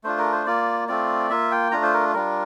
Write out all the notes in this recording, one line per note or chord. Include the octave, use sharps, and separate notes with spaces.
A3 D4 F4 C5
A#4
C5
A#3 F4 D5
A3 C4 F4 D5
A#3 F4 E5
G5
A3 D4 F4 A#5
C5
A#4
G3 D4 F4 A#4